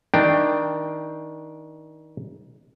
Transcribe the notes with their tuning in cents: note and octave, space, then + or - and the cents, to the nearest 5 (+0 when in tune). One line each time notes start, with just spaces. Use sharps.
D#3 +25 D4 +15 G5 +0